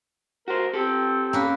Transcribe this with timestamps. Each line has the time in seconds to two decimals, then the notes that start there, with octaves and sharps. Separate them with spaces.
0.48 F#4 A#4 C5
0.73 C4 G4 A4
1.33 A#3 C#4 B4